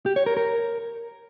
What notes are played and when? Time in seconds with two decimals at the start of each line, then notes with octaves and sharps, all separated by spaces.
0.06 G4
0.16 C#5
0.26 A#4
0.37 A#4